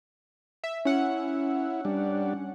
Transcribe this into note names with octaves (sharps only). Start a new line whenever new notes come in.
E5
C#4 E4 F#5
G3 D4